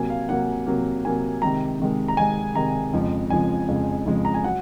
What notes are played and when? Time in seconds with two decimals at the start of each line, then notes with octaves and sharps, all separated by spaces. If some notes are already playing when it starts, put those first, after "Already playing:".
Already playing: C3 F#3 A#3 G#5
0.10 F5
0.29 C3 F#3 A#3 F#5
0.66 C3 F#3 A#3
1.05 C3 F#3 A#3 G#5
1.42 C3 D#3 G#3 A#5
1.80 C3 D#3 G#3
2.08 A#5
2.17 C3 D#3 G#3 G#5
2.55 C3 D#3 G#3 A#5
2.93 F2 C#3 F3 G#3
3.30 F2 C#3 F3 G#3 G#5
3.68 F2 C#3 F3 G#3
4.06 F2 C#3 F3 G#3
4.25 A#5
4.34 G#5
4.44 F#3 F#5